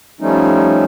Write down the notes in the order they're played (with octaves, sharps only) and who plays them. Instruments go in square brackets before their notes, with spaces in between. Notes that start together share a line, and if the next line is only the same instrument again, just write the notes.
[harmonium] F3 G3 A3 C#4 D#4